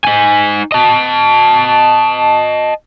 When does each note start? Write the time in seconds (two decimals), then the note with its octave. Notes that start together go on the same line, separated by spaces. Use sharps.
0.05 D#4 G#5
0.72 D#5 A5